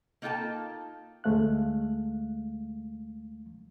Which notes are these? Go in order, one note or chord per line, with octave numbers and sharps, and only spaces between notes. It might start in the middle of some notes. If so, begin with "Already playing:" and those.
A#3 D#4 F4 A4 G5 A5
D2 G#3 A3 F5 F#6